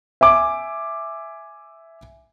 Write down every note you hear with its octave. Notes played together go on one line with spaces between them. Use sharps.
E5 G#5 D6